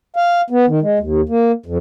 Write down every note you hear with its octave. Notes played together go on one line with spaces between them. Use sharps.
F5
B3
D#3
G#3
D#2
A#3
F2